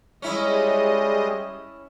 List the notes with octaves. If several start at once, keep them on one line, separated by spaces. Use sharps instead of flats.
G3 G#3 C#4 E4 D#5